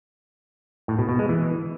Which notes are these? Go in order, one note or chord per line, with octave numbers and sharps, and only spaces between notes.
A2
B2
B2
G#3
E3